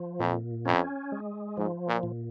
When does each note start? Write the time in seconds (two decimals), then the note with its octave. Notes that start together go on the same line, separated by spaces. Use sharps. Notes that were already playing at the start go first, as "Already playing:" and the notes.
Already playing: F3
0.19 F2 A#2
0.65 F2 C#4
1.12 G#3
1.57 G#2 F3
1.88 A#2
2.03 A#2